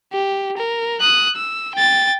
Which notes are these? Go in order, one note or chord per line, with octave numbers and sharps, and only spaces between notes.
G4
A#4
D#6 F#6
E6
G5 A6